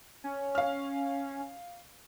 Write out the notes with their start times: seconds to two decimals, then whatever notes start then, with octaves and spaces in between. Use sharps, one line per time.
0.24 C#4
0.55 F5 F6